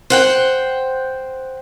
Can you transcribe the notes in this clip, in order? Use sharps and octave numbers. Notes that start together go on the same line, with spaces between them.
C5 F#5 G5